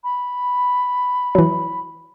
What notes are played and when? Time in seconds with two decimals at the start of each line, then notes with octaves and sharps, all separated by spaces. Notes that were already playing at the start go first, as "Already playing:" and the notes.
0.04 B5
1.35 E3 F#3